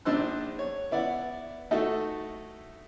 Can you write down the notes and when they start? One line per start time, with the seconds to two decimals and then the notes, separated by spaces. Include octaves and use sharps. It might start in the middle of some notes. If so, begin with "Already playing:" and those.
0.05 A#1 D4 D#4 C5 E6 F#6
0.59 C#5
0.91 B3 E4 D5 F#5
1.71 A3 D#4 E4 F#4 A4